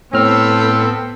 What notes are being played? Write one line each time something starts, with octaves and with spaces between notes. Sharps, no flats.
A2 B3 C4 A4 E6 F6